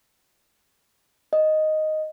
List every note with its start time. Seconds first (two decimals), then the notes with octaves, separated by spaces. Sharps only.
1.33 D#5